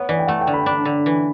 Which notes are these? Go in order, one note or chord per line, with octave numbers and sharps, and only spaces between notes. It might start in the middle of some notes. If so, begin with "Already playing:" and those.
Already playing: B3 C#5
E3 D5
G5
A3 F#5
G5
D3
B5
D4 B5
D3
E3